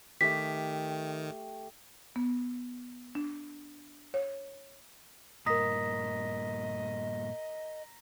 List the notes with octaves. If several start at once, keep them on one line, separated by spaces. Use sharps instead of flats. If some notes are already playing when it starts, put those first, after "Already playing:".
D#3 A3 G4 B6
B3
D4
C#5
G2 A#2 A#4 D#5 A#5 D#6 A#6 B6